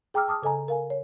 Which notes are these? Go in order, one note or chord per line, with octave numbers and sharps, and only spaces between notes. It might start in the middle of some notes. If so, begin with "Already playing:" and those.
G#4 G5 A#5 D6 E6 F6
A5 D6 D#6 F6
C#3 A4 D#5 G#5 A#5
A#4 F5 G#5
C#5